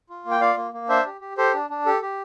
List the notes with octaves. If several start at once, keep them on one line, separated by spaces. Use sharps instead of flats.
F4
A#3
G5
F4 D5 F5
A#3
A#3
D4 C5 E5
G4
G4
G4 A4 C5
D4
D4
G4 A4
G4